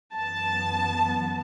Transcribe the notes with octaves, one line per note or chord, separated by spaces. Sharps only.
F#2 E3 B3 A5